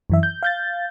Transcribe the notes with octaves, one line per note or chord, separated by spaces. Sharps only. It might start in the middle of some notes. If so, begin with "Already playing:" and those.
F#2 E3 E5
G6
F5 G6 A6